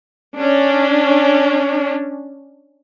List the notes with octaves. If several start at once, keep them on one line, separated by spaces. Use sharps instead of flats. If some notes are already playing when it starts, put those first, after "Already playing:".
C#4 D4